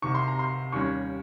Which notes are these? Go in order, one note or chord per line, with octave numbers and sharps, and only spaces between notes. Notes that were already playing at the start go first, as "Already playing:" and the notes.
C2 C3 D#3 C#6
C6
A#5
C6
D#2 D#3 G3 C#4 C#6